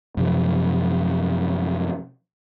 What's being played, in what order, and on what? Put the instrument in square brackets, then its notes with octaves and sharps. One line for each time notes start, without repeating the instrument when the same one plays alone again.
[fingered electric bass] F#2 C3 F3